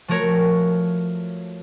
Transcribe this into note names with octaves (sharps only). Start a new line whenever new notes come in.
F3 A3 F#4 A#4 C#5